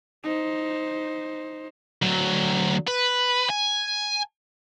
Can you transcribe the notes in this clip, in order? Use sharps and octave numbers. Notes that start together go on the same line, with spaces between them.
D#4 C5
D2 F#3
B4
G#5